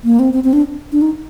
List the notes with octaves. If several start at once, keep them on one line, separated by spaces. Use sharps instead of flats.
A#3
C4
C4
C4
D4
D4
D#4